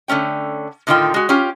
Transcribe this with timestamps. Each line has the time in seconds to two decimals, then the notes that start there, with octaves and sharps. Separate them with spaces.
0.08 D3 A3 C#4 G5
0.87 A2 D3 D#3 F3 F4 G5
1.14 G#3 F#4
1.29 C#4 F4 G4